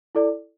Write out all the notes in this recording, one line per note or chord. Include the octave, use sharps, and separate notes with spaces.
E4 A4 D5